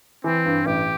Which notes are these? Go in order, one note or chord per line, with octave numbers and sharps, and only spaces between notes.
E3 C4
G2
A1 G4